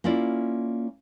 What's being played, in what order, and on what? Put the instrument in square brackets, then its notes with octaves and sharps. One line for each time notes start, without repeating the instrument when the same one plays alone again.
[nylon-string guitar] A#3 C#4 E4 F4 D5